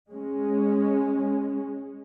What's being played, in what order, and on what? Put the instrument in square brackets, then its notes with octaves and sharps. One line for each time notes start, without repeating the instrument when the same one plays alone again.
[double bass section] G#3 C#4